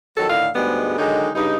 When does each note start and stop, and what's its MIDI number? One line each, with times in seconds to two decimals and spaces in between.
0.17 0.29 41
0.17 0.29 51
0.17 0.29 54
0.17 0.29 69
0.30 0.48 45
0.30 0.48 50
0.30 0.48 51
0.30 0.48 77
0.55 0.97 38
0.55 0.97 44
0.55 0.97 55
0.55 0.97 56
0.55 0.97 59
0.98 1.29 50
0.98 1.29 51
0.98 1.29 54
0.98 1.29 56
0.98 1.29 63
1.35 1.58 43
1.35 1.58 49
1.35 1.58 63